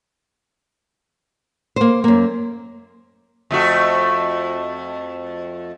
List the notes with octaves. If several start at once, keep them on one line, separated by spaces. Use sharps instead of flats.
A#3 C5
F#2 A#3
F2 A3 F#4